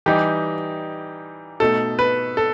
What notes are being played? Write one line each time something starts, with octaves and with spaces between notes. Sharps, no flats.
E3 G3 D#4 G4
B2 A3 D#4 A4
B4
A4